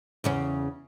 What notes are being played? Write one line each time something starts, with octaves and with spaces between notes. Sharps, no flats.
E2 C#3 C#4